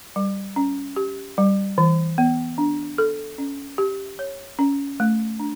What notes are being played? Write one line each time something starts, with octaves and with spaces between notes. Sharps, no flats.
G3
C#4
G4
G3
E3
B3
D4
A4
C#4
G4
C#5
C#4
A3
D4